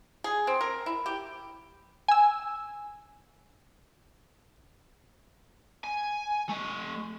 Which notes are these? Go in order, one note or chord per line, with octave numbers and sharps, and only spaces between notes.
G#4
C4
A#4
E4
G4
G#5 E6
G#5
A3 D#5